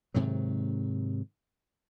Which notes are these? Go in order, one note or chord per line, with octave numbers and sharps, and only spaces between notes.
G#2 C3 D#3 F#3